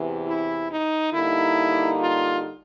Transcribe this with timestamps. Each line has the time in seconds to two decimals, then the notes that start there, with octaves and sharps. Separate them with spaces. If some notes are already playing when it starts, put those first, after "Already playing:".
Already playing: E2 C3 E3
0.27 E4
0.70 D#4
1.13 D3 G3 A#3 D#4 E4
1.99 F4